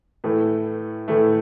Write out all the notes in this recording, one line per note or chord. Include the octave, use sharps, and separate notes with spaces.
A2 E3 A3
A2 E3 A3